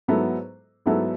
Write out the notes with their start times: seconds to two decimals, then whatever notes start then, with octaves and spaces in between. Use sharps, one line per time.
0.08 G#2 F#3 B3 E4 A4
0.86 G#2 F#3 B3 E4 A4